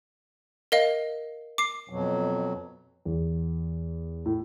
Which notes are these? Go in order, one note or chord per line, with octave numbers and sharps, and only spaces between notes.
A#4 D#5 F5
D6 C7
F2 B2 F#3
E2
A2